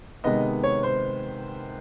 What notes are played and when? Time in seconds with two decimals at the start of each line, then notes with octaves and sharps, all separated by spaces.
0.24 C3 D#3 G#3 B3 D#5
0.63 C#5
0.83 C5